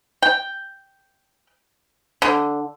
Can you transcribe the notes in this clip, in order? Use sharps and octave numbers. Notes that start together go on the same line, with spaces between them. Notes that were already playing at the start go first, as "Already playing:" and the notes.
G5
D3